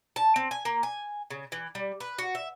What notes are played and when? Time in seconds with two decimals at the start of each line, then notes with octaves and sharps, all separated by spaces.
0.16 A5
0.36 C4
0.51 G#5
0.65 A#3
0.83 G#5
1.30 C#3
1.52 E3
1.75 G3
2.00 B4
2.18 F#4
2.35 E5